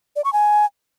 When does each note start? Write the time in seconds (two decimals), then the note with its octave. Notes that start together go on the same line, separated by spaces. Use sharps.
0.16 D5
0.24 C#6
0.33 G#5